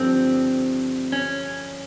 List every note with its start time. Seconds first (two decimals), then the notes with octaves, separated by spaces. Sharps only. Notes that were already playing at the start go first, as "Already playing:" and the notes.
Already playing: G2 D3 F3 A3 C4
1.12 C#4